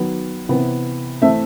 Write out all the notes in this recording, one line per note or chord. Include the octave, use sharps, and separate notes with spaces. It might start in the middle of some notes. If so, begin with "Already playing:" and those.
Already playing: D#3 F#3 B3
C3 E3 B3
E3 A3 C4 E5